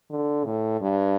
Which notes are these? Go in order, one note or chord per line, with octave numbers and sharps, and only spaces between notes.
D3
A2
G2